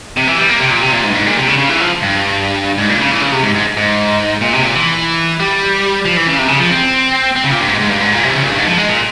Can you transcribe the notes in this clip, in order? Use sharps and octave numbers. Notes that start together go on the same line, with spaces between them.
C3
E3
G3
A#3
C3
A#2
C3
A#2
G#2
G2
G#2
A#2
C3
C#3
C#3
E3
F3
G2
G#2
A#2
C#3
E3
C#3
C3
G#2
G#2
G#2
A#2
C3
A#2
E3
G3
F3
E3
C#3
C3
C#3
F3
C4
C4
C#3
A#2
G2
G#2
G#2
G2
G#2
A#2
C3
E3
C#3
A#2
G2
G#2
F3
G#3
A#2